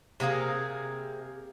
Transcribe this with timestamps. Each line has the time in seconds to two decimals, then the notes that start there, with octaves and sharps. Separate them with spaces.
0.20 C3 A#3 G#4 F5